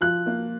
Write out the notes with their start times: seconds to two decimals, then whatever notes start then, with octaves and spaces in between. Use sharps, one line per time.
0.01 F3 F#6
0.26 A#3